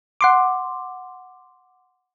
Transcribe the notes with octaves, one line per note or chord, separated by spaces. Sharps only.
F#5 C6 D6